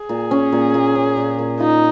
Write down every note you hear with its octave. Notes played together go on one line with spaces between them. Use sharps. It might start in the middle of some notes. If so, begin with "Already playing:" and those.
Already playing: G#4
A#2
C#4
A#2
A#2
C#4
A#2
A#2
D#4 F4